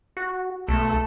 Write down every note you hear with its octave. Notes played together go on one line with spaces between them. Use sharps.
F#4
B1 A3 A4